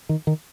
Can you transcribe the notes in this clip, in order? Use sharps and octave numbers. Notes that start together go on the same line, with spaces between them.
D#3
D#3